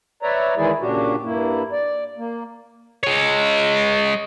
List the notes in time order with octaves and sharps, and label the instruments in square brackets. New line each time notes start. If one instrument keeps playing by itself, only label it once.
[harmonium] B4 C#5 D5 E5 A#5
D#3 E3 G#3 E4 G#4 D5
A#2 C#3 D4 F#4 G4
G2 A#3 E4
D5
A#3
[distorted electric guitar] G#3 C#5